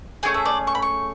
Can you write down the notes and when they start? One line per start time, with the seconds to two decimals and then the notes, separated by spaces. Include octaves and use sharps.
0.23 A3 C#4 E4 G#4 G#5
0.34 E5
0.45 D5
0.67 C#6
0.75 B5
0.82 C#6